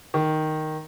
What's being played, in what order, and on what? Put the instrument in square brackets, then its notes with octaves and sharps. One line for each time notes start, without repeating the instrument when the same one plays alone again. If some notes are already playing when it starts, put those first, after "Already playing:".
[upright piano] D#3